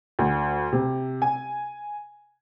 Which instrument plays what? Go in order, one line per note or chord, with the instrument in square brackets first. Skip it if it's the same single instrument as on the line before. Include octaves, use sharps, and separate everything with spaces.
[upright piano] D2
C3
G#5